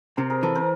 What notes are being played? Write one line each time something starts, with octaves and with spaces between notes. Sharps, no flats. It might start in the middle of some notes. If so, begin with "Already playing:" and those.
C3 A#4 C5
G#4 A#4
E3 A4 B4
A#4 C5